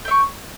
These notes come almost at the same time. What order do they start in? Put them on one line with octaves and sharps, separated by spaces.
G5 E5 C#6